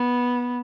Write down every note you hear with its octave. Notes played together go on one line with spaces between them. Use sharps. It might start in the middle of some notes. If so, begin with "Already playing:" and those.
Already playing: B3